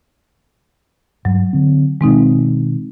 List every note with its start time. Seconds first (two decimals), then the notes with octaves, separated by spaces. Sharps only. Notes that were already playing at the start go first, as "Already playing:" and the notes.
1.25 G2 F#3
1.53 D3 C4
2.01 B2 D#3 G#3 C4 D#4